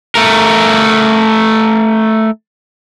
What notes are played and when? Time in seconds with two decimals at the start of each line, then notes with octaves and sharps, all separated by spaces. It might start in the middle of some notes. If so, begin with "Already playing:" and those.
0.15 A3 A#4